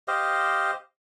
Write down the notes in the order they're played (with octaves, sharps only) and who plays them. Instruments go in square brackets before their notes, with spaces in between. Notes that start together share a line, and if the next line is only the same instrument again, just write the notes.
[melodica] G4 C5 D#5 F5